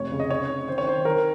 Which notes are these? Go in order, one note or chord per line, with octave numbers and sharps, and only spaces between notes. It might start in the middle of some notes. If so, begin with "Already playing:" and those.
Already playing: F1 C#5
C#3
D#5
C#4 C#5
C#4
D#3 C5
C#5
D#3 C5
D#3 A#4